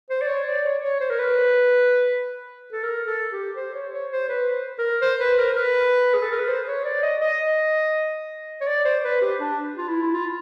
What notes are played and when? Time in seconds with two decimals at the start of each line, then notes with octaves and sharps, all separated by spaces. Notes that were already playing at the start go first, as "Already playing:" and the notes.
0.10 C5
0.22 D5
0.27 C#5
0.47 D5
0.65 C#5
0.83 C#5
1.00 C5
1.10 A#4
1.19 B4
2.72 A4
2.83 A#4
3.07 A4
3.32 G4
3.56 C5
3.74 C#5
3.93 C#5
4.12 C5
4.29 B4
4.78 A#4
5.02 C5
5.20 B4
5.38 A#4
5.53 A#4
5.57 B4
6.14 G#4
6.22 A4
6.31 A#4
6.39 B4
6.48 C5
6.67 C#5
6.85 D5
7.03 D#5
7.21 D#5
8.61 C#5
8.67 D5
8.85 C5
9.04 B4
9.21 G4
9.40 D4
9.78 F4
9.88 E4
10.03 E4
10.14 F4